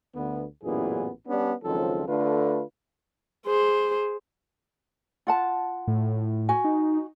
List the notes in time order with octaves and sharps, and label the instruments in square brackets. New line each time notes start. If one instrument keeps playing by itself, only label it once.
[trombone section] D2 D3 B3
A1 F#2 A#2 E3 B3 G#4
G3 B3 C#4 D4
C#2 D#3 F3 F#3 C4 A4
D3 A3 F4 B4
[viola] G#4 C5
[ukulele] F4 F#5 A5
[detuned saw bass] A2
[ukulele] F#4 G#5
[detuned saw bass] D#4